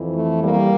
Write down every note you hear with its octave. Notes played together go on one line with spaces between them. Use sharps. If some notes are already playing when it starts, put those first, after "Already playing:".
Already playing: F2 E3
A3
G3 A#3